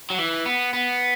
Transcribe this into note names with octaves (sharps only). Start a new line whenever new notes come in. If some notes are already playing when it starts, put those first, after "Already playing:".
F#3
E3
B3
B3